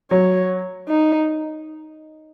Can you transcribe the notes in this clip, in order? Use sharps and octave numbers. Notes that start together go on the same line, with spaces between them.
F#3 C#5
D#4